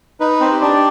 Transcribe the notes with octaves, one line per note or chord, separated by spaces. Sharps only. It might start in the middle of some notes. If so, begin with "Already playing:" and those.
D#4 B4
C4 C5
G4
D4 D5